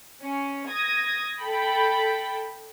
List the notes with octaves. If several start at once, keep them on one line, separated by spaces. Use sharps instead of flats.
C#4
D#6 G#6 A#6
A4 G5 B5